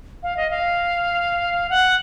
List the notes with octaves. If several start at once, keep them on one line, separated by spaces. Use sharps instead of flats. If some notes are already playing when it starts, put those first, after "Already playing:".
F5
D#5
F5
F#5